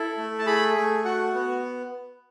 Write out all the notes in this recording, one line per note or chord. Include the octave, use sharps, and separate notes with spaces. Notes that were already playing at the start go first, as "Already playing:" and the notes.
Already playing: E4 A4
A3
A5
G#4 B5
A3
F#4 F#5
B3